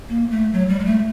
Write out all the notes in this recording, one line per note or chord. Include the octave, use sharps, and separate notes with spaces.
A#3
A3
F#3
G3
G#3
A3